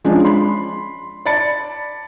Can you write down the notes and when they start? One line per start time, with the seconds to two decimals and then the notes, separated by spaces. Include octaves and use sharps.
0.05 F3 G#3 C#4 D4
0.25 B5 C6
1.26 D5 A5 B5 A6 C#7